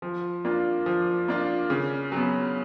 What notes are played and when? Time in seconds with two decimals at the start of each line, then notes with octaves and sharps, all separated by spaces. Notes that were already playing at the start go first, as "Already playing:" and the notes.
0.02 F3
0.45 A#3 D4 F4
0.86 F3
1.28 A#3 D4 F4
1.70 C#3
2.12 F#3 B3